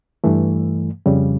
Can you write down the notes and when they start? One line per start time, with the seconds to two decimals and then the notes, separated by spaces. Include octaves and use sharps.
0.24 G2 E3 A3
1.06 F2 C#3 G3